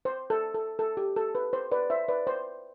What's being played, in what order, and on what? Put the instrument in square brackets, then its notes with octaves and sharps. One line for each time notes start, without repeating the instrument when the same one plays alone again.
[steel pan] C5
A4
A4
A4
G4
A4
B4
C5
B4 D5
C5 E5
B4 D5
C5